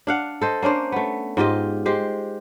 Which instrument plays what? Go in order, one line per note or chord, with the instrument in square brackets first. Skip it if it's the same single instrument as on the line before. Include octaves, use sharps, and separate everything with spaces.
[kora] D4 F5 F#5
A4 C5 D#5
A#3 C#4 D4 C5
A3 B3
G#2 F4 G4 D#5
G#3 G4 C5